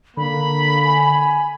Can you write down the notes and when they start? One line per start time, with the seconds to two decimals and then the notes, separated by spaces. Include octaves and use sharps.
0.17 D3 A#3 B5
0.85 G#5